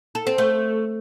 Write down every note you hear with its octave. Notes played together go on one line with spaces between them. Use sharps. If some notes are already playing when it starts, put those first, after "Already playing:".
A4
C4
A3